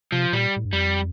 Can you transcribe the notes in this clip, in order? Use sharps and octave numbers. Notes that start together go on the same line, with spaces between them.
C3 F3
A#2 G3
A2
G2
F2 G3